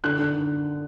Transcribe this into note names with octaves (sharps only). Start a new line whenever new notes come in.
D3 F#6
D3